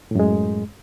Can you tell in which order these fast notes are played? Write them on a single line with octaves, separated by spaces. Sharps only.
A2 F#2 G#3